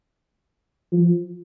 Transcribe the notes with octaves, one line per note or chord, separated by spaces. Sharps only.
F3